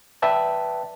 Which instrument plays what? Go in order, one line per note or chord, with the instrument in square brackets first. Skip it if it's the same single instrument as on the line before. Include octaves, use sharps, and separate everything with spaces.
[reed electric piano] B4 D5 E5 G5 A5